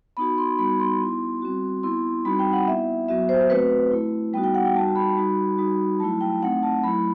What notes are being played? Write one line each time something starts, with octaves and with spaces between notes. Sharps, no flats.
B3 D#4 F#4 B5
C6
G3 B3 D#4 F#4 B5
C6
B3 E4
G3 C4 F#4
B3 E4 C6
G3 C4 D#4 F#4 B5
G5
F#5
B3 E4 E5
F#3 B3 F#4 E5
C5
A3 C4 F#4 B4
A3 E4
G3 B3 D#4 F#4 G5
G5
F#5
G5
G3 D#4 F#4 A5
B5
G3 D#4 F#4
G3 D#4 F#4
F#3 A3 E4 A5
G5
A3 C4 D#4 F#5
A5
F#3 A3 E4 B5